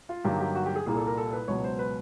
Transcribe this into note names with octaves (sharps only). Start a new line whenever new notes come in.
F4
G2 D3 F#3 A#3 D#4 G4
G4
F#4
G4
G#4
C2 A#2 G3 A#3 G#4
A4
A#4
A4
B4
C#2 B2 F#3 B3 C#5
C5
B4